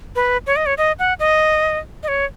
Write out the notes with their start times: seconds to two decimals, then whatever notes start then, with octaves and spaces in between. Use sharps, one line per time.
0.16 B4
0.47 C#5
0.56 D#5
0.66 C#5
0.78 D#5
0.99 F#5
1.20 D#5
2.03 D#5
2.08 C#5